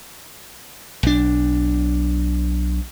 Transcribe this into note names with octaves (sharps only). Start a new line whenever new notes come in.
B1 D4